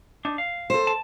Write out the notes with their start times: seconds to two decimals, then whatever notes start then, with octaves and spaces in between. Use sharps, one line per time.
0.25 D4 D#4
0.38 F5
0.70 A4 C5
0.87 A5